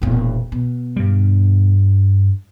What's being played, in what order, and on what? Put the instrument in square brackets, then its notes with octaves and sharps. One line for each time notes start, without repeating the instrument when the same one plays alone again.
[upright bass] E1 A#2
B2
[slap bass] G2 G3